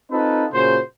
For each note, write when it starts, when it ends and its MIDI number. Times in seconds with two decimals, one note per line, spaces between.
0.11 0.45 60
0.11 0.45 63
0.11 0.45 65
0.11 0.45 69
0.11 0.45 71
0.52 0.78 46
0.52 0.78 49
0.52 0.78 66
0.52 0.78 72